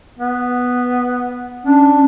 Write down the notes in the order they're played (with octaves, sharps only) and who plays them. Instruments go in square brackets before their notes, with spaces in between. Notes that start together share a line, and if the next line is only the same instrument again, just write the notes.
[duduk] B3
[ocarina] C#4 [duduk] D4